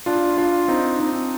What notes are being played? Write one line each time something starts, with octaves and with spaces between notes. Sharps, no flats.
D4 F4
D4 F4
C4 D#4
C4 D#4